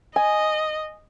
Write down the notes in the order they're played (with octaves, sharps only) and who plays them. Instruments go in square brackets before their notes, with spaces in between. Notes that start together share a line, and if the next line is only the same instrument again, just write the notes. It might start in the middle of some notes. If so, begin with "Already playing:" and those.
[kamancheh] D#5 [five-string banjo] G#5